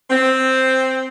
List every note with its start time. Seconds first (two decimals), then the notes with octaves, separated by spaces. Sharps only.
0.10 C4